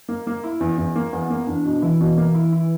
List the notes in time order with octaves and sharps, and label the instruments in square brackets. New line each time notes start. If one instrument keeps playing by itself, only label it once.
[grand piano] A#3
A#3
E4
E2
E2
A#3
[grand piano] E2 [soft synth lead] B3
[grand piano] A#3
[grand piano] E2 [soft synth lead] D4
[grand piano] B2
[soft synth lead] E3 [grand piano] E4
[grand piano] B2
A#3
E4
E4